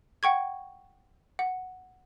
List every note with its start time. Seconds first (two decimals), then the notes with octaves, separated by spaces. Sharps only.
0.23 F#5 G5 C#6 G#6
1.39 F#5